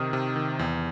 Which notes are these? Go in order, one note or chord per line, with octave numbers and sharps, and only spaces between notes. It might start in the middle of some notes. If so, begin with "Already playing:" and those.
Already playing: C3 D#3 D#6 F6
C3
D#3
E2